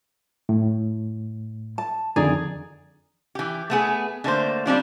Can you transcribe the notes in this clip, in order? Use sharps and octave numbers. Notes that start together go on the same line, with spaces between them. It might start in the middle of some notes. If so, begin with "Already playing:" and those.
A2
A5
F2 D3 D#3 G#4 D5 A#5
E3 G4
A3 B3 G#4
D3 A3 A#3 C5
G3 C4 D4 F4